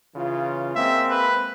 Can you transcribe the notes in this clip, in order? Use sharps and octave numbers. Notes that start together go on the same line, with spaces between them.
C#3 E3 F4
G#3 A#3 C4 E5
B4